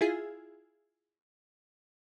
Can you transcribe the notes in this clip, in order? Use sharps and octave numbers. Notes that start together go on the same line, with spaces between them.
E4 F4 G#4